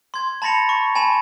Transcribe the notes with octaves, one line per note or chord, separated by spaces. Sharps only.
C6 G#6
A5 B5 A6 A#6 C#7 F7
C#6
G#5 A5 B5 E7